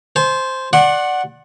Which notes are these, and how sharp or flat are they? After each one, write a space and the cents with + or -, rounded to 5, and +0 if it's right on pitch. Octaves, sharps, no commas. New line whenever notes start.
C5 +0 A5 -45
D5 +0 F#5 +0 C6 +45